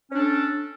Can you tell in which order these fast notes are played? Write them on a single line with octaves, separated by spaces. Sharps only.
C#4 D4 A4